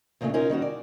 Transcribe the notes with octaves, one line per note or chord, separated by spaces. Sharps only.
D#2 A#2 C#3 G3 A3 D4
C#4 D#4 F4 A#4
D#3 G3 C#4 F#4
D5